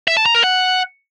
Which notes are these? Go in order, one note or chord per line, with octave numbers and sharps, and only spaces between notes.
E5
A5
A#5
A#4
F#5